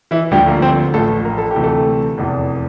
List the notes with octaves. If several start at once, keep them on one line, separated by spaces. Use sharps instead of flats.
E3 E4
D2 D3 F3 G3 G4
A#3 A#4
C4 C5
A1 A2 F3 A3 A4
A#4
A4
G4
D2 C3 E3
A3 A4
F1 E2 E3